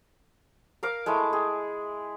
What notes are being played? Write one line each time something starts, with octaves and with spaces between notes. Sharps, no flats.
A#4 F5 D6
G#3 A3 E4 E5
G#4